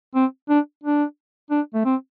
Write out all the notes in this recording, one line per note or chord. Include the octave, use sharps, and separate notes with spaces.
C4
D4
D4
D4
A3
C4